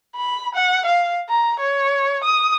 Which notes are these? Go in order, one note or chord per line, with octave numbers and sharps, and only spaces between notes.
B5
F#5
F5
A#5
C#5
D#6